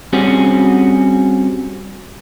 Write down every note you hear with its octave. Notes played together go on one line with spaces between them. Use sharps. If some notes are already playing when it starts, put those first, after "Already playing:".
G3 C4 C#4 F#4 G#4